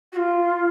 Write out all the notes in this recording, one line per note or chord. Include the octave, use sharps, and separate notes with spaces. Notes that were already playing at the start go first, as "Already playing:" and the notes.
F#4
F4